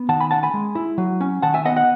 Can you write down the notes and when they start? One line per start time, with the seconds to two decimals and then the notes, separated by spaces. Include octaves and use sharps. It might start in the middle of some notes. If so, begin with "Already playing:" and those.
Already playing: B3
0.09 D#3 F#5 A5
0.20 G#5 B5
0.31 C#4 F#5 A5
0.43 G#5 B5
0.54 G#3
0.75 E4
0.98 F#3
1.21 C#4
1.42 D#3 F#5 A5
1.54 E5 G#5
1.65 B3 D#5 F#5
1.76 D#5 F#5